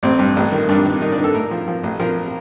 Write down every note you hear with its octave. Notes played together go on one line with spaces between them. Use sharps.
A1 C4
G2
A1
D#3
G2 D4
D#3
D#3 D#4
D4
D#3
A4
A2 A#4
F3
F3
A1
F3 A#4